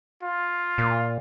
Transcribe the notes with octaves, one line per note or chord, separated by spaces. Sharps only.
F4
A#2